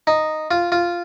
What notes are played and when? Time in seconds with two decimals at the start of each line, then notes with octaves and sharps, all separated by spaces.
0.07 D#4
0.51 F4
0.72 F4